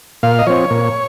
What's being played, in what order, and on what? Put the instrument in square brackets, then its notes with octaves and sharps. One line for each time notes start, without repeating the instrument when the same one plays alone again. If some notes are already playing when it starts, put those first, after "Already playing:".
[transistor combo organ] A#2 F5
D#5
F3 C4 C#5
A#2